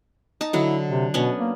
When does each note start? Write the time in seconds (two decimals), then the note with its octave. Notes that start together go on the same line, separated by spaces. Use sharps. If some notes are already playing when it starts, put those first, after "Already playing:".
0.41 D#4 A5
0.53 D3 F#3 E4
0.89 C3
1.14 B2 B3 C#4 D4
1.39 A#3